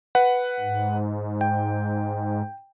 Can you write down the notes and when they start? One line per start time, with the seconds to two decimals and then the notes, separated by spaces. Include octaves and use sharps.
0.15 B4 F#5
0.60 G#2
1.41 G5